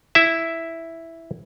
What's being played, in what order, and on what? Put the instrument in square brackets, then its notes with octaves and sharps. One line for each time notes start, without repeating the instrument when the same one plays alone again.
[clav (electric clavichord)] E4 E5